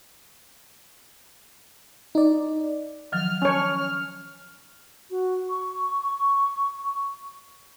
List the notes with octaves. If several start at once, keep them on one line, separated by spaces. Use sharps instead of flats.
D#4 D5
D#3 F3 F#3 F6
C#4 C#5 G#5 A5
F#4
C#6